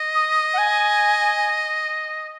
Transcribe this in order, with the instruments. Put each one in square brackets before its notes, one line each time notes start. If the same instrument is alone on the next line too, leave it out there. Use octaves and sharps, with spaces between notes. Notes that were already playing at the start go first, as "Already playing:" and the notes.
Already playing: [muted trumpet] D#5
[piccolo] D#6
F#5
G#5